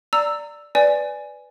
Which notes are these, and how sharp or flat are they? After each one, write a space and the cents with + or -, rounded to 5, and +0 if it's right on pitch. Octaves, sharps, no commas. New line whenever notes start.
D5 +0 A#5 -20 E6 +0
B4 +10 D5 +0 G#5 +0